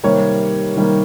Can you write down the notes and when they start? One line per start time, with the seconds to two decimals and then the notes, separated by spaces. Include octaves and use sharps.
0.04 C3 D#3 G3 A#3 C#5
0.76 C3 D#3 G3 A#3